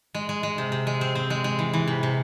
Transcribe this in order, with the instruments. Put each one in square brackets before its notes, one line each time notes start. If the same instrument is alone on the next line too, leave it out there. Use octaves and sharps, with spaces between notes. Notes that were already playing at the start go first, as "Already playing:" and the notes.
[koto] G#3
G#3
G#3
C3
C3
G#3
C4
C4
G#3
G#3
E3
E3
C3
C3